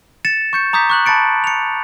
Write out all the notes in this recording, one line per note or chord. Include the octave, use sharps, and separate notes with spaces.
A6 C#7 E7
C#6 G6 C#7
A#5 D6 D#6 G6 B6
C#6 F#6 F#7
A5 B5 A6 C#7 D7
C#7 F7